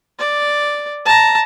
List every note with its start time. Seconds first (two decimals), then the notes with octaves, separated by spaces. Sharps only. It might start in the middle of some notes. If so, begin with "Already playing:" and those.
0.19 D5
1.06 A5 A#5